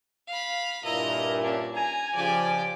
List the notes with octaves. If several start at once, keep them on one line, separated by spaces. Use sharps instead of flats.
F5 B5
G2 A#2 E4 D#5 A#5
C#4 D4
G#5 A#5
C#3 F3 G4 D5